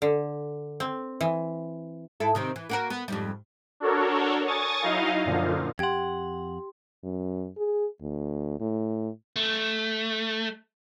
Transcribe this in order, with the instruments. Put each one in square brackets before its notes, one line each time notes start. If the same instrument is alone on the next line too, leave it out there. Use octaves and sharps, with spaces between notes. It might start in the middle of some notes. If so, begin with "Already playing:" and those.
[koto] D3
C4
E3
[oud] G#2 E4 A4
C3 D#3 C4
E3
A#3 F#4 A#4
B3
F2 G#2 G3
[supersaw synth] D4 F#4 A4 A#4 C#5
G#5 C#6 D#6 A6
F#3 D#4 E4 D#5 F5
F#2 A#2 D3 F3
[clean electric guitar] F2 F#5 [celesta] G4 C6 [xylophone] G5 G#6
[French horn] F#2
G#4
D2
A2
[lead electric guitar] A3